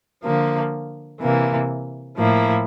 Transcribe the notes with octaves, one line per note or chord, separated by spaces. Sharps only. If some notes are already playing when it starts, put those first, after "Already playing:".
D3 F3 A#3
C3 E3 A#3
A2 F3 A#3 E4